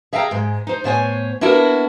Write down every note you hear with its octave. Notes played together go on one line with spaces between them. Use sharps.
G#4 E5 F5 G5 A5 A#5
G#2 G#3
D#4 C5
A2 B3 C5 C#5 G5 G#5
A#3 B3 D4 E4 F#4 A#4